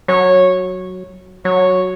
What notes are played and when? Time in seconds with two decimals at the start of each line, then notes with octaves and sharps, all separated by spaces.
0.08 F#3 C#5
1.45 F#3 C#5